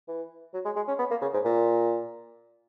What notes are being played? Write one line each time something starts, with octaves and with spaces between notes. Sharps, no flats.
E3
F#3
G#3
G#3
C#4
B3
A#3
C#3
G#2
A#2